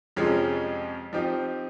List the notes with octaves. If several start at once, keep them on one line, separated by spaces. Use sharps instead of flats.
F2 C3 F3 G#3 C#4
F3 C4 D#4 G4